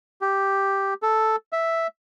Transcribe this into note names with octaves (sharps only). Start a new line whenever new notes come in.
G4
A4
E5